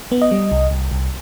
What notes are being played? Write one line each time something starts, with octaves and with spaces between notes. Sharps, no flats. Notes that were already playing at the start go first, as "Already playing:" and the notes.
B3
D#5
G3
C2
C2
C2